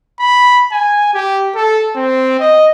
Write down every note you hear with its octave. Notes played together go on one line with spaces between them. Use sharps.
B5
G#5
G4
A4
C4
D#5